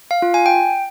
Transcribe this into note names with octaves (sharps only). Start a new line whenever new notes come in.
F5
F4
G#5
G5